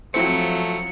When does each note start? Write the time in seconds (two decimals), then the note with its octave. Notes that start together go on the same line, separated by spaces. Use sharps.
0.14 F3 F#3 A3 C4 E4 C#7